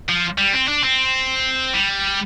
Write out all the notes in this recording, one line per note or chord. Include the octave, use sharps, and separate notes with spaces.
F3
G3
C4
D4
C4
G3